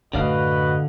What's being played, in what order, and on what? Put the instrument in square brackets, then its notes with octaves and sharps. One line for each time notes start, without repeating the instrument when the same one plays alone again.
[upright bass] F#2 A2 [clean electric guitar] D3 D5 F5 [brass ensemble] F#4 B4 D#5